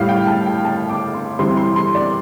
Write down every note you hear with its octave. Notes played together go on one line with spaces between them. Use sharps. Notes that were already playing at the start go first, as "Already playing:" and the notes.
Already playing: A2 G3 F5
G5
A5
G5
A5
D6
C6
C3 E3 G3 C6
C6
C6
D5